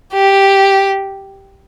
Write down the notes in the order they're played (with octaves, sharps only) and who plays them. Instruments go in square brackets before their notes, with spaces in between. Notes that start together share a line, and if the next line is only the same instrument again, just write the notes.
[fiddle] G4